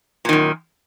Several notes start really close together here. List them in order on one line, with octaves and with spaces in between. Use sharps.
A#2 D#3 F#2